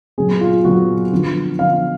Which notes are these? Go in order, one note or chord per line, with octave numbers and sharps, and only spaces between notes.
A#2 F#3 B3 G#4
F4
A#2 F#3 B3 F#4
D3 F3 B3
D3 F3 B3 F5